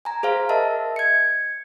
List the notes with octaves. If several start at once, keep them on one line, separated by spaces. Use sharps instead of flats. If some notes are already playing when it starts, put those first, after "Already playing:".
G#5 A#5
G#4 C5 F5
A#4 D#5 E5 A5
G#6 C#7